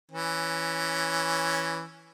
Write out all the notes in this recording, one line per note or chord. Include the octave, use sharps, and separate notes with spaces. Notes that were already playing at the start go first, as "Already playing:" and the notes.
E3 C#4